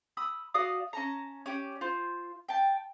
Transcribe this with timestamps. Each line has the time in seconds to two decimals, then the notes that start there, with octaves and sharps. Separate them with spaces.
0.17 B5 D#6 E6
0.54 F#4 D5 F5 D#6
0.93 C#4 A5 A#5
1.46 C#4 G4 D5
1.81 F4 C5
2.48 G5 A5